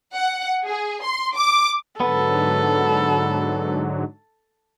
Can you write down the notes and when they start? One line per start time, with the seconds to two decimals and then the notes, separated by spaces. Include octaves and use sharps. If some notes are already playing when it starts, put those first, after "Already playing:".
0.14 F#5
0.64 G#4
1.03 C6
1.35 D6
2.00 G#2 D3 F#3 B3 A4